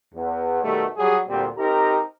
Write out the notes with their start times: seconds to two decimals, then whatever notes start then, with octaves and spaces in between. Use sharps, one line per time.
0.15 E2
0.63 B2 D#3 G3 A3
0.96 F#3 G3 G4 G#4
1.28 D2 A#2 G3 C4
1.57 C4 D#4 G4 A#4 A#5